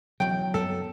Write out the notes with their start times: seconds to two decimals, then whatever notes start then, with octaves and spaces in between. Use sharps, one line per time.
0.20 B1 E2 C#3 F#3 G5
0.54 F#2 G3 B3 A4